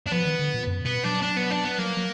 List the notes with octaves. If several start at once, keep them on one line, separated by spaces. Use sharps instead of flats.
D4
F3 B3
D#3
D3
A#2
F#2
B2 B3
F#3 D4
D4
B3
D4
B3
F#3 A#3
F#3